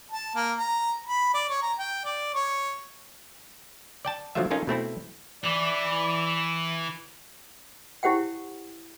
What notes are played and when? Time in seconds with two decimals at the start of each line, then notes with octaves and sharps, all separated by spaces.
0.12 A5
0.36 A#3
0.59 A#5
1.07 B5
1.34 D5
1.49 C#5
1.62 A#5
1.79 G5
2.05 D5
2.35 C#5
4.05 D5 G5 A5
4.35 D3 F3 F#3 A3 F4 E5
4.51 C#4 D#4 F4 A4 A#4
4.67 B2 A3 C4 E4
5.44 E3 D5
8.03 E4 G4 C5 F#5 G5